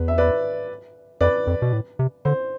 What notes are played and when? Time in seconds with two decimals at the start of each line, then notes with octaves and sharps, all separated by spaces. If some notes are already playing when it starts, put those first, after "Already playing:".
Already playing: E2 B4
0.08 E5
0.18 B4 D5
1.21 F2 B4 D5
1.47 F2
1.62 B2
1.73 A2
1.99 C3
2.25 D3 C5